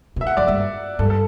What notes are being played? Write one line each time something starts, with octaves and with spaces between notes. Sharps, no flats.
B2
E5
F#5
F#2 D5
G2 E5
G2 A4
A4